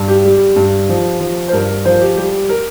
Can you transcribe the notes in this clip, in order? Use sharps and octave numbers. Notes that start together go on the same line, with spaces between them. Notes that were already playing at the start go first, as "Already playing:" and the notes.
Already playing: G2
G4
G3
G2
F3
F3
C5
G2 A#4
A#4
F3 C5
G4
G3 G4
A#4